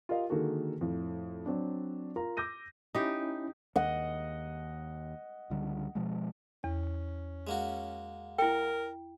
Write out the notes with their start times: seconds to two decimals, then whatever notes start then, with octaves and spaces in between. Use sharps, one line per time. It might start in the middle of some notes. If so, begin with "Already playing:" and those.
0.09 F4 G4 A#4 D#5 F5
0.30 D3 D#3 G#3 A#3 F#4 A4
0.81 F2 A2
1.46 F#3 C4 D4
2.16 F4 A#4 A#5
2.37 D6 E6 G6 A#6 D#7
2.95 C#4 D#4 E4 G4
3.76 D#2 D#5 F#5
5.50 C#2 D3 G3
5.95 B2 F3 G#3
6.64 E2 C#4
7.47 G#3 A#3 F#4
8.38 E4 A#4 G5